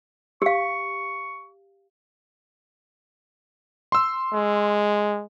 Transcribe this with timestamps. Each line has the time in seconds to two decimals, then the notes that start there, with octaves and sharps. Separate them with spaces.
0.42 G4 F5 C#6
3.92 C6 E6
4.33 G#3